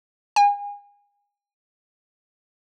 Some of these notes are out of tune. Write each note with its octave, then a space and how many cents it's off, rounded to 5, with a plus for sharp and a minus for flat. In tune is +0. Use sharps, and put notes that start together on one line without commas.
G#5 -35